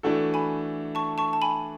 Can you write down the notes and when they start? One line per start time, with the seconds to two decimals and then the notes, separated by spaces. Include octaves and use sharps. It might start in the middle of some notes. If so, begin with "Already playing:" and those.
0.03 E3 A3 D4 F#4 A4
0.34 G#5 B5
0.95 A5 C#6
1.18 A5 C#6
1.33 A5
1.42 G#5 B5